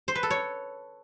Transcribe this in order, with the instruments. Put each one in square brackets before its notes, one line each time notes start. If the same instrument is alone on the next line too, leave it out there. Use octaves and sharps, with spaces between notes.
[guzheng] C5
B4
A4
C#5